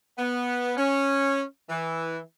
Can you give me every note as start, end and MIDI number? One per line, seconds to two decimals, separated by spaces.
0.18 0.72 59
0.77 1.42 61
1.69 2.18 52